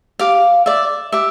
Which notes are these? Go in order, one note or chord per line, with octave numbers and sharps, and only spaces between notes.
G4 F5
D5 E5
G4 E5